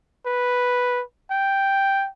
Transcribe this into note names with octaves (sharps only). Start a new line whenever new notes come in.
B4
G5